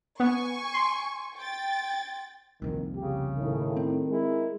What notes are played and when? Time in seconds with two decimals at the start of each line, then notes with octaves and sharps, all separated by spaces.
0.20 B3 G#5 C#6
0.73 C6
1.37 G5 A6
2.62 C2 F2 A#2 D#3
2.96 C#3 G4
3.36 A2 D#3
3.77 C4
4.07 G#3 E4 A#4